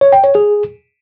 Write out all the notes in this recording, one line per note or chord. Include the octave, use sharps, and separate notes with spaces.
C#5
G5
C#5
G#4